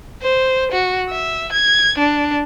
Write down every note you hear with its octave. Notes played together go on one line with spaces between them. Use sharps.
C5
F#4
E5
G#6
D4